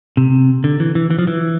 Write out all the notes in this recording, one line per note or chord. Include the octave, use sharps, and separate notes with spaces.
C3
D3
E3
E3
E3
F3
E3